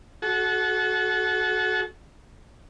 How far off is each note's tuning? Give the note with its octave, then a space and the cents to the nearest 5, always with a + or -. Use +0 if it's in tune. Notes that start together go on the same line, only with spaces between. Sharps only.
F#4 +0 A4 -35